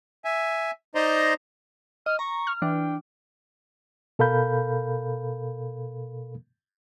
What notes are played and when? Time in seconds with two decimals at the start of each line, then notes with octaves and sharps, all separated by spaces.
0.25 E5 G#5
0.95 D#4 C5 D5 D#5 A#5 C6
2.06 D#5 F6
2.19 A#5 C#6
2.47 F6
2.62 E3 D4 G5
4.19 B2 A4 A#4 F5 B5 G6